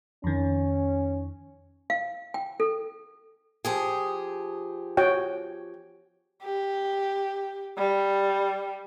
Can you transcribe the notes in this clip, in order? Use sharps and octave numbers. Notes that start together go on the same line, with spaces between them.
F2 D#3 C#4
F5
G5
A4
F3 G4 G#4
F#4 C#5 G5
G4
G3